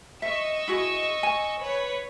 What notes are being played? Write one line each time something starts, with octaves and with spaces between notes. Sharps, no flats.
D#5 E5 C#6 E6
E4 F#4 G#4
G#5
B4 C#5